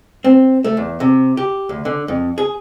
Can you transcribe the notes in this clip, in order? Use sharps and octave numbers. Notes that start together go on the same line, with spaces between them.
C4
A3
E2
C3
G4
D2
D3
F2
G#4